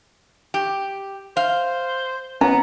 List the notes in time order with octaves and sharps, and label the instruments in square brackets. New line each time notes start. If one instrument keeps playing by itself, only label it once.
[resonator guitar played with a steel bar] G4
[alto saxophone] C5 [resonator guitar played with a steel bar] F5
[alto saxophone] B3 [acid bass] C#4 [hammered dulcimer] A#5